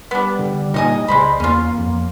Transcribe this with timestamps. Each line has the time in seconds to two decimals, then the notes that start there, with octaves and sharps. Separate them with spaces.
0.11 G3 B3 D4
0.39 D3
0.74 A#2 D#4 D#5 G#5
1.08 C#2 G#3 C5 D5 B5
1.40 E2 A#3 C#4 F4
1.78 F2